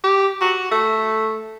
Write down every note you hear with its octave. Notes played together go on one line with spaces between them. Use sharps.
G4
F#4
A3